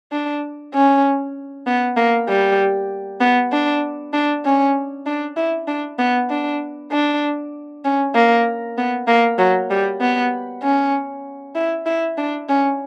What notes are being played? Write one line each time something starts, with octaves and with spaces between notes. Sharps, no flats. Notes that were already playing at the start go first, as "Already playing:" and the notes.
D4
C#4
B3
A#3
G3
B3
D4
D4
C#4
D4
E4
D4
B3
D4
D4
C#4
A#3
B3
A#3
F#3
G3
B3
C#4
E4
E4
D4
C#4